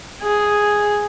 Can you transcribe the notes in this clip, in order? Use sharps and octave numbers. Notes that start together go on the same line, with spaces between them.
G#4